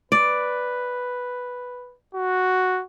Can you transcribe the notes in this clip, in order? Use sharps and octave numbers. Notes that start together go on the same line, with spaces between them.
B4 D5
F#4